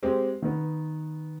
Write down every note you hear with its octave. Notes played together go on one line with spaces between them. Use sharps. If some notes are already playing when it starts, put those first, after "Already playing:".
G#3 C4 G4
D#3 B3